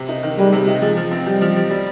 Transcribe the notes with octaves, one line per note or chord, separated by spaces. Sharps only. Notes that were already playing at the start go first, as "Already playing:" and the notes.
Already playing: C3
D#4
D#3
G3 G#3
C3
D#4
F3 G#3
F3
C4
G3 G4
F3
F3
G3